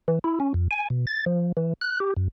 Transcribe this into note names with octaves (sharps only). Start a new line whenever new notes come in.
E3
E4
C#4
F2
G#5
B2
A6
F3
E3
F#6
G4
F#2